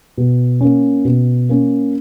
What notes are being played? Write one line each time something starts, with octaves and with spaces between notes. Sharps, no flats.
B2
A#3 C#4
B2
A#3 C#4